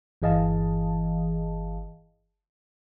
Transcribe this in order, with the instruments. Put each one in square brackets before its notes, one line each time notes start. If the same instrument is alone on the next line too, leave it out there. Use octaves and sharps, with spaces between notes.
[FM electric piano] G1 E3 G#4 D#5 F5 A5